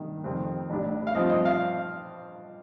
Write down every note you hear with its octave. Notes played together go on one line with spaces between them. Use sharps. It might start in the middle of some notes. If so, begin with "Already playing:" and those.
Already playing: G2 D#3 A#3 D#4
F2 D#3 G3 C4
A1 A2 G3 D4
F5
G2 F3 C4 D#5
D#5
F5